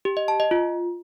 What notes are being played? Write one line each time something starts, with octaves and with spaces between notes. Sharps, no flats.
G4
D#5
A5
D#5
F4